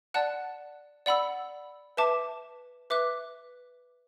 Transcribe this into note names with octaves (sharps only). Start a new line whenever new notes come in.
D5 F#5 A5 F#6
D5 F#5 B5 E6
B4 E5 A5 D6
B4 E5 D6 F#6